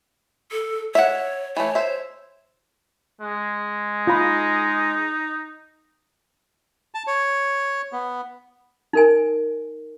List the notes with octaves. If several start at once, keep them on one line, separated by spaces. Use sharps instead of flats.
A4
C#5 E5 F#5
E3 A3 C#5
C5 E5
G#3
D#4 F4 B5
A5
C#5
B3
D#4 A#4 G#5